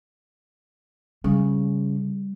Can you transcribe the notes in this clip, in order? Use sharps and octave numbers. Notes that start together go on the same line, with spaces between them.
C#3 G3